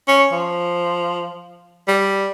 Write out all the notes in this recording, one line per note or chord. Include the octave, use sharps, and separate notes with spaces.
C#4
F3
G3